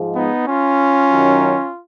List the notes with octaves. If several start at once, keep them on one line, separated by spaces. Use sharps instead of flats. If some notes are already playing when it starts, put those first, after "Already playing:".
Already playing: G#2 F3 G#3
B3 D#4
C#4 F4
F#2 D#3 F#3